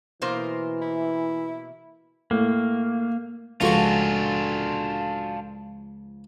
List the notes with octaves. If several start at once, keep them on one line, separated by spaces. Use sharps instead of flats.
B2 E3 A#3 C5
E4
A2 A#3
C#2 F3 D4 F4 F#4 A4 G#5 C#6